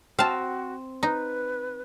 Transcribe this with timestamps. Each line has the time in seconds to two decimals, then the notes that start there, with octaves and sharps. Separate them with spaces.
0.19 C4 F#4 F5 A5
1.03 D#4 B4